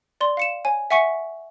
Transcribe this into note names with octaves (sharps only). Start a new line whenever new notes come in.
D5 C6
F5 C#7 E7
C#5 G#5
E5 F#5 G#5 C#6 B6 C#7